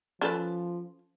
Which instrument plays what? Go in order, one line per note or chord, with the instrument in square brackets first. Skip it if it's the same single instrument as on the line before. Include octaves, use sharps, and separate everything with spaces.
[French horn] F3 [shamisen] C#4 A4 B4